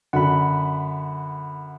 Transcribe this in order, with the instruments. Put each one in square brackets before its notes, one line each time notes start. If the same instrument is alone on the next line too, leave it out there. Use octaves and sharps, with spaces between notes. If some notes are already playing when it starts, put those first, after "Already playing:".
[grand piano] F#2 D3 [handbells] F#5 B5